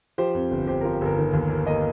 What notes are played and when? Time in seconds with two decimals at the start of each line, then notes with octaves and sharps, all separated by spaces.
0.18 F3 G4 C5
0.35 F2
0.51 G1
0.67 G1 G4 C5
0.81 F3 A#4
0.93 G4
1.01 G1 A#4
1.18 D#3
1.33 D#2
1.50 A#3
1.67 A#3 A#4 D#5